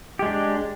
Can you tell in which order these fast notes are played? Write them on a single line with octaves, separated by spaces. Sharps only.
G4 G#3 D4